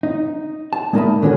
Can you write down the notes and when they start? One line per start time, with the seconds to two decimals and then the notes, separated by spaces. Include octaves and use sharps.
0.03 D#4
0.73 A5
0.93 G#3 A#3 D#4 A#4 E5 B5
1.22 D3 D#3 C#4 F4 F#4